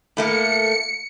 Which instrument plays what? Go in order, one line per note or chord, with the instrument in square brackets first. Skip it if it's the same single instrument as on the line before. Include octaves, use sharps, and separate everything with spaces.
[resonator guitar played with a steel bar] A2 A3 A#3 [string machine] C#7